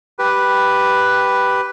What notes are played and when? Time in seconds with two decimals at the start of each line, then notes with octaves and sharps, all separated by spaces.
0.19 G4 B4